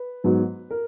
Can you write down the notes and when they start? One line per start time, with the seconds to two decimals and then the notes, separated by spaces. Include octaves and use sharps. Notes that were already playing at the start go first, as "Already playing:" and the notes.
Already playing: B4
0.24 G#2 F#3 B3
0.70 A#4